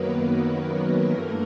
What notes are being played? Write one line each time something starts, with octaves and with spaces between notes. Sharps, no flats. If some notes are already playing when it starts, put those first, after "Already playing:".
Already playing: F#2 D#3 F#3 A#3 B3 A#4 B4
B3 B4
G2 E3 A3 A#3 A#4